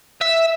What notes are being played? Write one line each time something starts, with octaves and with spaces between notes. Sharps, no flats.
E5